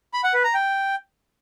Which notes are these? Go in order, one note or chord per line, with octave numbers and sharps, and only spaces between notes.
B5
F#5
B4
A#5
G5